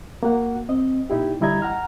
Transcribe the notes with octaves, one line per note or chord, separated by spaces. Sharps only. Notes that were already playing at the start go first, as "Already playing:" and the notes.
A#3 F#4 F#5
C4 D#5
A#2 D#4 E4 G4
D3 G3 E4 D#5 A#5 G#6
F#5 A#5 F6